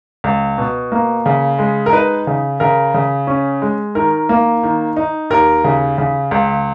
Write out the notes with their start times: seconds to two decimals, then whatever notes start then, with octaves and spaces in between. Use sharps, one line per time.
0.24 C#2
0.58 B2
0.92 A#3
1.26 C#3
1.59 G#3
1.86 A#4
1.92 D#4 B4
2.27 C#3
2.60 C#3 A#4
2.94 C#3
3.27 C#4
3.62 G#3
3.95 D#3 A#4
4.29 A#3
4.63 D#3
4.97 D#4
5.30 D#2 A#4
5.64 C#3
5.98 C#3
6.31 C#2